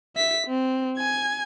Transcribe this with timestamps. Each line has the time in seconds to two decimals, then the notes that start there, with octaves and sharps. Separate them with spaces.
0.16 E5 B6
0.47 C4
0.98 G#5 G#6